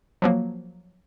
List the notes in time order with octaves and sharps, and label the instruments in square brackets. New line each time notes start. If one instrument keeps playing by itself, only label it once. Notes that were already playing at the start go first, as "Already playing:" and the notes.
[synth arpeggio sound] F3 F#3 A#3